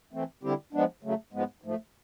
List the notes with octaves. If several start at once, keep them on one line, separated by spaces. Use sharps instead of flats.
E3 A3 C4
D3 G3 C4 E4 G4
F3 G#3 B3 D4
C#3 F#3 A3
G#2 F3 G#3 B3
G#2 F3 A3